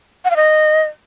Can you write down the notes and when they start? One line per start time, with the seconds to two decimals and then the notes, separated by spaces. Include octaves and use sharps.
0.25 F#5
0.30 F5
0.36 D#5